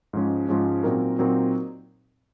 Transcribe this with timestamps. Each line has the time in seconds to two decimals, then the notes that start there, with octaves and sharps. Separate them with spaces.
0.13 G#2 F3 G#3 C#4
0.49 G#2 F3 G#3 C#4
0.83 A#2 F#3 C4 D#4 A#4
1.19 A#2 F#3 C4 D#4 A#4